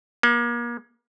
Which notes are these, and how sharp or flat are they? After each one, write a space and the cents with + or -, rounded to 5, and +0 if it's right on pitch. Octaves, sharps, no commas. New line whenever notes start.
A#3 +35